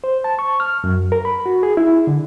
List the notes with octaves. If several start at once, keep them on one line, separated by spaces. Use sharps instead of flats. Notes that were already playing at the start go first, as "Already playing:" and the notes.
C5
A5
C#6
F6
F#2
A#4
B5
F#4
G#4
E4
D3